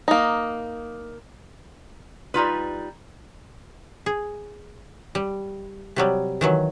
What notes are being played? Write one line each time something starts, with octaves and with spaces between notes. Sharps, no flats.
A#3 D#4
G3 D#4 F4 B4
G#4
G3
C3 F#3 G3
D#3 E3 F#3